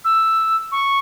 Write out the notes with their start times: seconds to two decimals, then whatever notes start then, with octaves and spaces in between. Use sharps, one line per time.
0.05 E6
0.72 C#6